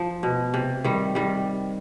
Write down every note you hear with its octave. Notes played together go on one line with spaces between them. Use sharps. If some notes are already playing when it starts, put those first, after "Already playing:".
Already playing: F3
B2
C3
D#3 G3
D#3 G3